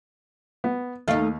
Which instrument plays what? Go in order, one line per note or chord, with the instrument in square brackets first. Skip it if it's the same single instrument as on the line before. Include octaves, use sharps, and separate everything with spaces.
[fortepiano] B3
[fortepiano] D#2 F5 [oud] A3 D#4